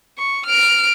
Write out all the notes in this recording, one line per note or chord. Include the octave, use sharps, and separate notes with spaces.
C#6
F6 D7